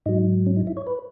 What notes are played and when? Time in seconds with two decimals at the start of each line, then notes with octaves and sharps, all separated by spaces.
0.06 G#2 F#3 D#4
0.46 C#4
0.56 D#4
0.67 E4
0.77 C#5
0.87 B4